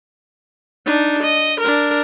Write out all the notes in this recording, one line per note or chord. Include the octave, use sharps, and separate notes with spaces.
D4 D#4
D#5
D4 A#4